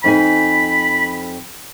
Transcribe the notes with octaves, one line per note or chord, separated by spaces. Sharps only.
F2 D#4 G#5 B5